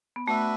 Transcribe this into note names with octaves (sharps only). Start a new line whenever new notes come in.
B3
A3 D4 F#4 B4 E5